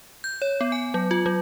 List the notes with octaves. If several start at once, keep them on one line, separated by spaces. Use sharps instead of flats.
G6
C#5
B3
G#5
F#3
F4
F#3